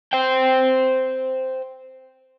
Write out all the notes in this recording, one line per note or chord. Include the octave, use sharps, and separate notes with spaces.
C5 G5